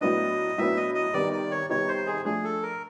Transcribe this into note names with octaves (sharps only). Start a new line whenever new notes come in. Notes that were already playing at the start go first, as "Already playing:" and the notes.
A2 F#3 B3 D4 D#5
A2 F#3 B3 D4 E5
D#5
D#5
C3 D#3 G3 B3 D#4 D5
D5
C#5
C3 D#3 G3 B3 D#4 C#5
C5
G#4
F3 A3 D4 G#4
A4
A#4